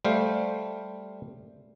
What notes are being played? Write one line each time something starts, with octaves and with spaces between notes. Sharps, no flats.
G3 A3 C5 F5